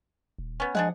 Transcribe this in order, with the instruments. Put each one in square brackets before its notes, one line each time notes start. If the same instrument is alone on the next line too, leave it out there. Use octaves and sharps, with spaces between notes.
[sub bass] D#1
[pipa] B3 C#4
[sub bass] F3 [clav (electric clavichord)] G#3 [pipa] D4 G#4 F#5